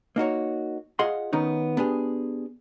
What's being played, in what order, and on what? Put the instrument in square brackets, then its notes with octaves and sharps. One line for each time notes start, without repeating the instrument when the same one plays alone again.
[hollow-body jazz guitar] A#3 D#4 F#4 C#5
F4 G#4 D#5 F5 F#5 C6
D#3 B3 C#4 D#4
B3 D4 G4 G#4